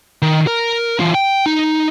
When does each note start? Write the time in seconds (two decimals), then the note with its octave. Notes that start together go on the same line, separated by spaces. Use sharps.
0.22 D#3
0.47 A#4
1.00 E3 F4
1.15 G5
1.46 D#4